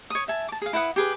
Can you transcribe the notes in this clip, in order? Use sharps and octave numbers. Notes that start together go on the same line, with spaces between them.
C#5 D#6
E5 G#5 A5
A5 D6
G#4 F5
E4 B4 F#5 D#6
G4 G#4 B4